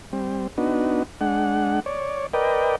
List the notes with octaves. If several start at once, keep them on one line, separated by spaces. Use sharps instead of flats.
G3 C4
B3 D4 D#4 F#4
G#3 D4 F#5
C#5 D5
A#4 B4 D5 D#5 G5